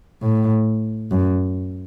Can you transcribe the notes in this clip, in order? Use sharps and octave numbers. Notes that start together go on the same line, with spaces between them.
A2
F#2